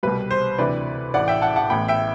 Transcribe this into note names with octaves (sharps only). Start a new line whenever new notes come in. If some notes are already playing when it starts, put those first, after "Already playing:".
C2 B2 G3 B4
C5
D2 C3 E3 B4 D5
A1 A2 E3 D5 F#5
E5 G5
F#5 A5
F#5 A5
A1 A2 E3 B3 G5 B5
E5 G5